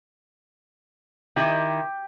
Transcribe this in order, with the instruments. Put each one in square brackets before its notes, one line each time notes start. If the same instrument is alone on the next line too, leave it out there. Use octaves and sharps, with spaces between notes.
[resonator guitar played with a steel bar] D#3 E4 [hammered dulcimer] G4